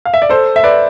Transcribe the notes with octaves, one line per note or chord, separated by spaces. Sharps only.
F5
E5
D5
A4 C5
E5
B4 D5